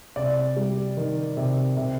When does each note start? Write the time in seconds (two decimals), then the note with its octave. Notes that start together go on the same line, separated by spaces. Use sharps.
0.16 C3 D5
0.56 G3
0.97 D#3
1.37 C3
1.77 C3